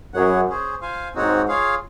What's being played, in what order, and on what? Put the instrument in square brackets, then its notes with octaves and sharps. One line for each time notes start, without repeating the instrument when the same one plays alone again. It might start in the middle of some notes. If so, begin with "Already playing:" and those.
[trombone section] F#2 [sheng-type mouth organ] G#4 C#5 F#5
[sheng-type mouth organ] C#4 G#4 C5
F4 C5 F5 G#5
[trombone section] G#2 [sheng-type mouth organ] C4 D#4 F#4 C#5 F#5
[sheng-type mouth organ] F4 G#4 C#5 F5